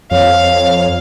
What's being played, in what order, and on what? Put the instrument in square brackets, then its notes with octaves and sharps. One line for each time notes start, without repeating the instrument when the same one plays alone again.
[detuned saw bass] F2 [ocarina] C#5 [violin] F5